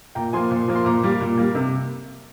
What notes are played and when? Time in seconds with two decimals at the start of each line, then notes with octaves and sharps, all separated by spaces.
0.15 A#2 G5 A#5
0.33 F3 A#3 G#5 C6
0.51 A#2
0.68 F3 A#3
0.75 C6
0.85 A#2 A#5 D6
1.03 G3 A#3
1.21 A#2
1.38 G3 A#3
1.55 C3